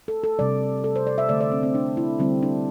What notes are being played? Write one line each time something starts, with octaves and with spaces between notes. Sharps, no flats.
A4
A4
C3 G3 D5
A4
C5
D5
E5
D3 A3 D5
D5
C4
C4
D4
E4
D3 G3 C4
D4